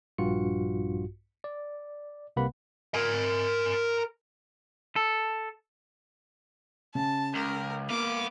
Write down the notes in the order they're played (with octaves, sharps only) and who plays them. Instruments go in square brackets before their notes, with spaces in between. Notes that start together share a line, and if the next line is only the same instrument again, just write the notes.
[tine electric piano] A#1 G2 F4 F#4 C#7
D5
C2 C3 A#3 B4 F#5 B5
[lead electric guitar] A#4 G#5
[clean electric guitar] A4
[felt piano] C#3 [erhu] A5
[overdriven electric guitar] C#2 [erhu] A#4
[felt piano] A#3 [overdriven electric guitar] B3 F5 [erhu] D6